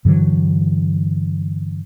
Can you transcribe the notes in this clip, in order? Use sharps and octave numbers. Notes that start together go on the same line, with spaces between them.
G2 D3 E3 F#3